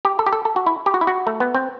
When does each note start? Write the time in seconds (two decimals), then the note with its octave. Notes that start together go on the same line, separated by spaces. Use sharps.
0.05 G4
0.19 A4
0.26 G4
0.33 A4
0.45 A4
0.56 F#4
0.66 E4
0.86 G4
0.94 F#4
1.01 E4
1.07 F#4
1.27 A3
1.40 B3
1.55 C4